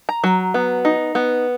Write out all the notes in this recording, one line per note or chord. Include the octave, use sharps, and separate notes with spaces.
A#5
F#3
B3
D#4
B3